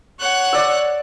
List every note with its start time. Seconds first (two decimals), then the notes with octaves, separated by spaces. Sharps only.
0.20 C#5 F#5 F#6
0.53 D5 E6